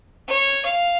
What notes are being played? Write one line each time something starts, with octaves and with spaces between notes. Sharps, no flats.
C#5
F5